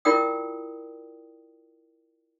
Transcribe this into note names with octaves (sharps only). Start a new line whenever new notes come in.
E4 F4 A#4 D5 G5 D#6